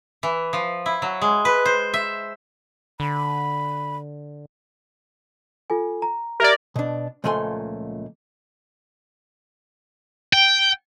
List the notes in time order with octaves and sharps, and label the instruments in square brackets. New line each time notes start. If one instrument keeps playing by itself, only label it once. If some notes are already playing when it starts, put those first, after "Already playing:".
[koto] E3
F3
E4
F#3
G#3
B4
C5
E5
[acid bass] D3 [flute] B5
[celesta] F4 A4 G#5
A#5
[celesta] G4 E5 G#6 [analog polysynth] A#4 D5
[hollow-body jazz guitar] B2 D4
C#2 A#2 F3 A3 G#5 C6
[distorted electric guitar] G5